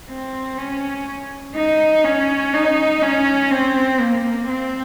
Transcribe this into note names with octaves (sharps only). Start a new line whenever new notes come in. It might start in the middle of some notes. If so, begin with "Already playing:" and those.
C4
C#4
D#4
C#4
D#4
C#4
C4
A#3
C4